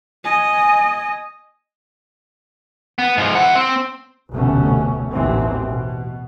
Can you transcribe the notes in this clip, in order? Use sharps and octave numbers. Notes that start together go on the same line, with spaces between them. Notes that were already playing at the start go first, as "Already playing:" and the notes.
D#5 G#5
B3
G#2 F3
E4 F#5
C4
F1 D2 B2 A3 C#4
A1 D#2 B2 E3 C4
B2